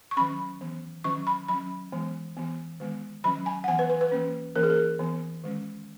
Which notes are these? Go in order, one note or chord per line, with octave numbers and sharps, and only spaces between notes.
C#6
D#3 F#3 C#4 B5
E3 B3
D#3 F#3 C#4 C#6
B5
F#3 C#4 B5
E3 G#3 B3
E3 B3
D#3 G#3 B3
D#3 F#3 C#4 B5
G#5
F#5
E3 B3 G#5
B4
B4
B4
E3 A#3 C#4
E3 A#3 C#4 A#4
G#4
A#4
E3 B3
D#3 G#3 C#4